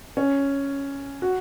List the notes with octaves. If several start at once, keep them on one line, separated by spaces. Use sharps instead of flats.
C#4
F#4